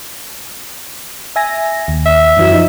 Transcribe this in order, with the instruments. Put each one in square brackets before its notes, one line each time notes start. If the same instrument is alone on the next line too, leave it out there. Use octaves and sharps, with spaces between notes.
[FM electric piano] E5 G#5 A#6
D#2
[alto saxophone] E5
[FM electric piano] F#2 E3 F#3
F3 D#4